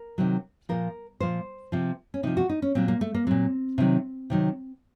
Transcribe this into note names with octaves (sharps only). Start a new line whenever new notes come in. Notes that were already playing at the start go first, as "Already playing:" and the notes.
Already playing: A#4
C3 D#3 F#3
A#2 F3 A#4
A#2 F3 C5
C3 F3
C#4
C3 F3 D#4
F#4
D#4
C#4
A#2 F#3 C4
A#3
A3
A#3
A#2 F#3 C4
C3 D#3 F#3
C3 D#3 F#3